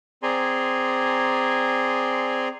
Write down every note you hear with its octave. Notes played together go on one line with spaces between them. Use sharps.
C4 G#4 D5 G#5 A#5 C6